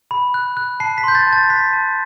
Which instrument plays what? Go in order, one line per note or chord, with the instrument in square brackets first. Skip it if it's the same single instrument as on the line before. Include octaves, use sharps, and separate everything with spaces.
[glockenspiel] B5
F#6
F#6
A5 C7
B6
C6 G6
A6
A5
A6
F#6 B6
A5